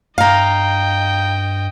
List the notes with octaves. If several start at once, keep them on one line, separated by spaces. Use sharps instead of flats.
G2 D#5 F5 G5 A#5